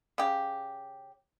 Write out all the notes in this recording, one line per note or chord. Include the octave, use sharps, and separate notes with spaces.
C#3 G4